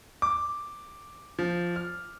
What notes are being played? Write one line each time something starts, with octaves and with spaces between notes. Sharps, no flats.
D6
F3
F6